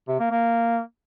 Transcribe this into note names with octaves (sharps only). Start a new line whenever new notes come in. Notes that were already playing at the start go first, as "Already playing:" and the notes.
C3
A#3
A#3